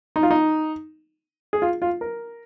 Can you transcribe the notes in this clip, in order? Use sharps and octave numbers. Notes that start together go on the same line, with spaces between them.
D#4
F4
D#4
G#4
F4
F4
A#4